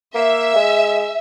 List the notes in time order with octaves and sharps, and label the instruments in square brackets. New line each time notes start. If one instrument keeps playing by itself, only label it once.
[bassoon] A#3 [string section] E5
[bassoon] G#3